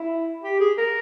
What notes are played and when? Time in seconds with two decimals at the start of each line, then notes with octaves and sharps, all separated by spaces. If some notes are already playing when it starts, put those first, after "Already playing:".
Already playing: E4
0.43 G4
0.60 G#4
0.78 A#4